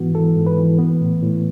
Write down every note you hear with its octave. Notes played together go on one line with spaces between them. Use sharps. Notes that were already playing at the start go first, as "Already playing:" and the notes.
Already playing: G#2 E3 B3 F#4
E3 A4
G#2
B4
E3
B3
A2
A2